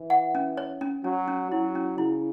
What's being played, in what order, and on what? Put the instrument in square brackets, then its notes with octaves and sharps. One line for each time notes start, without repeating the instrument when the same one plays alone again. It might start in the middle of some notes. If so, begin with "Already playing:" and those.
Already playing: [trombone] E3
[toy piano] F#5
C#4
C#5
C#4
[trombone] F#3 [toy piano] C#4
[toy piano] C#4
[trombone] F#3 [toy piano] E4
[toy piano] C#4
[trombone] C#3 [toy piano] E4